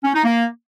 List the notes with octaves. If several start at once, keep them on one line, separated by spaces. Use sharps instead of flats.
C#4
D#4
A#3